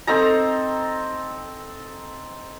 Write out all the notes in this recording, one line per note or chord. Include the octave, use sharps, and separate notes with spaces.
C4 D#4 A4 A#5